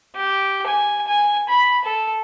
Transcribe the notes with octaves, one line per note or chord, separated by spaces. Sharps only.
G4
G#5
G#5
B5
A4